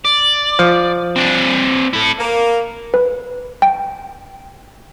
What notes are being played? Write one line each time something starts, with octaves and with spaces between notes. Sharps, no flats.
D5
F3
C4 D4
E4 A4
A#3
B4
G5